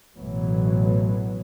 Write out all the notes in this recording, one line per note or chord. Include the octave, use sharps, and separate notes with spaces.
A1 B2 E3 F#3